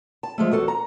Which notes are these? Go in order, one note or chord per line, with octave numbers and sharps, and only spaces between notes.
A5
F3 G#3 A3
E2 F#4 A4
A#5